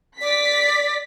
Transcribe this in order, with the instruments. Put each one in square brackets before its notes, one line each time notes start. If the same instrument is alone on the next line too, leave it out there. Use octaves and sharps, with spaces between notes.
[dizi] D5 [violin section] B6